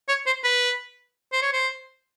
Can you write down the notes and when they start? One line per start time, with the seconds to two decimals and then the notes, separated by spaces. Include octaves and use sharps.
0.08 C#5
0.26 C5
0.44 B4
1.33 C5
1.42 C#5
1.53 C5